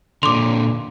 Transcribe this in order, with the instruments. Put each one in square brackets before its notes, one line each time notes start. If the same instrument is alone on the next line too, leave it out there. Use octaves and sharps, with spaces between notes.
[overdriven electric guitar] A#2 D3 [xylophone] C6 D6